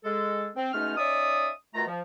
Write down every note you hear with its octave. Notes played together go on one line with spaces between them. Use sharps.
G#3 A4
C4
B2 G#3 A3 C#4 D#4 F6
C#4 D#4 D5 E5 D#6
B2 D#3 A3 F4 A#5
F3